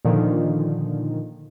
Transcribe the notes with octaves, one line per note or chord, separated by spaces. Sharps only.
A#2 D3 D#3 F3